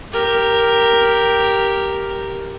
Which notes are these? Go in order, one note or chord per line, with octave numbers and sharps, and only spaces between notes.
G4 A#4